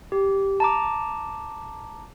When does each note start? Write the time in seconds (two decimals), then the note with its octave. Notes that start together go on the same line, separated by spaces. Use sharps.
0.12 G4
0.60 A5 A#5 D6